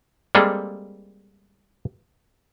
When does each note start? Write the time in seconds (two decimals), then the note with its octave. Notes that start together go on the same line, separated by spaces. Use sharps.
0.35 G3 G#3 A#3 C4 G#4 A4